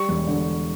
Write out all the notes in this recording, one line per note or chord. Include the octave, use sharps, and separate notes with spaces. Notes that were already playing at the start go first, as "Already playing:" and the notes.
Already playing: G3 C#6
E1
D3